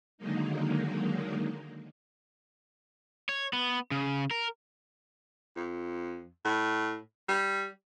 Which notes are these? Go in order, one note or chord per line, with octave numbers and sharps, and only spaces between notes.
D3 D#3 F#3 G#3 A#3 D#4
C#5
B3
C#3
A#4
F2
A2
G3